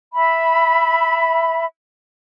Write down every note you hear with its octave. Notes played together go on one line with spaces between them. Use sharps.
E5 B5